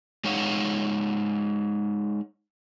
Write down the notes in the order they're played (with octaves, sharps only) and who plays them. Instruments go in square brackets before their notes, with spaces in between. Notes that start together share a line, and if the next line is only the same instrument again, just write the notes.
[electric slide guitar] G#3 D#4 C#5 F5 F#5